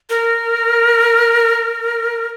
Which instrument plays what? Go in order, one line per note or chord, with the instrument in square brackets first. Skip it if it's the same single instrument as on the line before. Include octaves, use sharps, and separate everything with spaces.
[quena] A#4